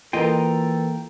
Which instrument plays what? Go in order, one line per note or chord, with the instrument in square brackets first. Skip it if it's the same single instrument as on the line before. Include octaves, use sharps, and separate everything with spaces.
[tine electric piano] E3 A#3 [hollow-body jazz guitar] F4 D#5 [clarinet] A4 [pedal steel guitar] G5 A#5